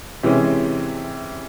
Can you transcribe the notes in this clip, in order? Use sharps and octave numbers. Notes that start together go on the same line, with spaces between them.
C3 E3 G#3 C#4